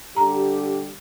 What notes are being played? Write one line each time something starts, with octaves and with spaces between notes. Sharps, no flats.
D3 G3 G4 A#5